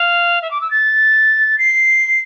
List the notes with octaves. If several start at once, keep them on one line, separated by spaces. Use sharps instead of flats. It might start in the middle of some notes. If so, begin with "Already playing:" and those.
Already playing: F5
E5
D6
E6
A6
C7